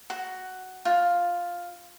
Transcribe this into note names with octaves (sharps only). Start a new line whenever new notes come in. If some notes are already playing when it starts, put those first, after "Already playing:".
F#4
F4